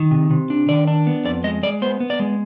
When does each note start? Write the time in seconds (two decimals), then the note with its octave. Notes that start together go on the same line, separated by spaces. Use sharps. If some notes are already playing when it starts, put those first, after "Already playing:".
Already playing: D#3
0.11 C3
0.31 C3
0.50 D4
0.68 D#3 D5
0.87 D4
1.07 B3
1.25 F2 D5
1.44 G#3 D#5
1.63 G#3 D5
1.82 B3 C5
2.00 B3
2.10 D5
2.20 G#3